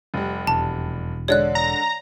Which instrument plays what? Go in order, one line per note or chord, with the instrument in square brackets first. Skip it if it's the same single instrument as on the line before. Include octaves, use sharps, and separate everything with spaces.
[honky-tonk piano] F1 G3
[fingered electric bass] E1 [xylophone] A5
[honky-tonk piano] D3 G#3 [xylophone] C#5 D5 F#6
[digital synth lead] A#5